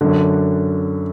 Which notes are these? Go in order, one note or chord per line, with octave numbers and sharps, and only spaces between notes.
F#2 D3 D4